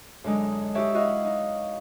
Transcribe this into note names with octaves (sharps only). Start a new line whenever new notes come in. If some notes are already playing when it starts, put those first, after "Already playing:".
F#2 D3 G#3 D#4
D#4 F#4 G4 C#5 E5
E4 F#4 D#5 F5 F#5
D#4